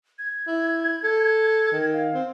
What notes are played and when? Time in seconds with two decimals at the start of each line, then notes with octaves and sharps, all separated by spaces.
0.19 G#6
0.47 E4
1.04 A4
1.72 D#3
1.93 F5
2.14 C4